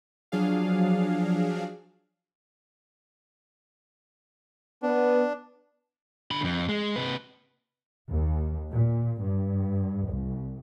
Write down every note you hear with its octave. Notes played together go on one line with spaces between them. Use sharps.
F3 F#3 D4 G#4 F5
B3 D4
D3 B5
F2
G#3
C3 B4
D#2
A#2
G2
C2